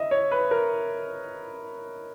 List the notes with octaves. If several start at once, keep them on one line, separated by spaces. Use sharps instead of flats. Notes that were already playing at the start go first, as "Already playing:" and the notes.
Already playing: D#5 E5
C#5
B4
A#4